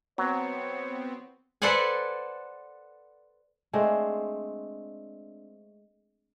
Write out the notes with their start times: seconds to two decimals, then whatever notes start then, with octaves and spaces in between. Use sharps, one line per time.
0.18 F#3 B3 C4 C#5
1.62 A4 B4 C5 D5 F#5 G#5
3.73 G#3 A3 C4 D4